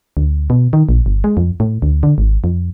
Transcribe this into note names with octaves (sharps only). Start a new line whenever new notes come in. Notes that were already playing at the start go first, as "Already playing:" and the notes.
D2
B2
D#3
A#1
G1
G#3
F2
A2
D2
D3
G#1
F2